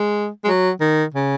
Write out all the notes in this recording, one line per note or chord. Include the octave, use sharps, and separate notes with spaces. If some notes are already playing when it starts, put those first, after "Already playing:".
Already playing: G#3
G#3
F#3
D#3
C#3